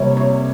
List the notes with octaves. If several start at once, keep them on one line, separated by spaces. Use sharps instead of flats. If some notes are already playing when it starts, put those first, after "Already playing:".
Already playing: C3 G3 A#3 C#5
C#5